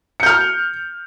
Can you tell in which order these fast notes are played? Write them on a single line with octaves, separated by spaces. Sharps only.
C#7 G6 F6